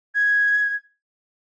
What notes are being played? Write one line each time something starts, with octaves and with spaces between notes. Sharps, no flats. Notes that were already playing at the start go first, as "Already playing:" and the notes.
G#6